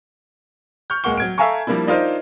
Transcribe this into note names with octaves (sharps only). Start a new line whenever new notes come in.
C#6 F6 G6
D1 G#3 A#3 F#5 C#6 G7
F#3 G#6 D7
A4 E5 F5 G#5 A#5 C#6
F3 G3 A#3 D4 E4
D4 D#4 F4 A#4 C5 D#5